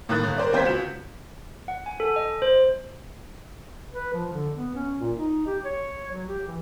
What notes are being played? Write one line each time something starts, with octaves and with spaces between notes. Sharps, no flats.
A2 D#3 A#3 D#6 F#6 A6
G1
A#4 C5 D5
D#2 C4 C5 G6 G#6 B6
C#2 F#4 E7
F#5
G#5
A4
D#5
C5
B4
F3
D3
B3
C#4
A#2
D#4
G4
C#5
F#3
G4
E3